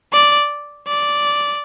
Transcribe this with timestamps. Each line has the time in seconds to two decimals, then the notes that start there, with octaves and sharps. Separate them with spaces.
0.13 D5
0.88 D5